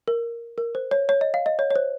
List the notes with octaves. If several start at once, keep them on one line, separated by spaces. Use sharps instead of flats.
A#4
A#4
C5
C#5
C#5
D#5
F5
D#5
C#5
C#5
C5